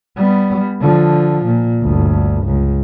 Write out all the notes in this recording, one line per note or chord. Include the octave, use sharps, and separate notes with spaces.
G3 B3
D3 F3
A#2
G1 D2
C#2